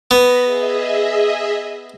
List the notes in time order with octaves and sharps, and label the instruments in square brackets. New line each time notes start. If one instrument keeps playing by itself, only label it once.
[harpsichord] B3 [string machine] B5 A#6
[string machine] G#4 D#5 E5